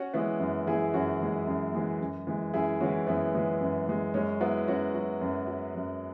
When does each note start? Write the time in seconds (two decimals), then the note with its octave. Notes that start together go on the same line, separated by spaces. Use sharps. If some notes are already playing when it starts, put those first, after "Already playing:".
Already playing: C#4 F#4
0.14 E3 G#3 B3 E4
0.40 F#2
0.67 E3 G#3 E4 G#4
0.94 F#2 C#4 F#4
1.21 E3 G#3
1.47 F#2
1.74 E3 G#3
2.00 F#2
2.27 E3 G#3
2.54 F#2 E4 G#4
2.81 E3 G#3 C#4 F#4
3.07 F#2 B3 E4
3.35 E3 G#3
3.61 F#2
3.88 E3 G#3
4.14 F#2 G#3 C#4
4.40 F#3 B3 E4
4.68 F#2 C#4 F#4
4.95 F#3
5.21 F#2
5.47 F#3
5.75 F#2